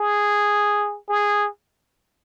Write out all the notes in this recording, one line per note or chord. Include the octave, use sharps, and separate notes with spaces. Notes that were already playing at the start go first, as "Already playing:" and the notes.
Already playing: G#4
G#4